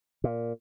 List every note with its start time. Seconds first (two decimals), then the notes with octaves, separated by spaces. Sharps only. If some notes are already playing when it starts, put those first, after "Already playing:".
0.24 A#2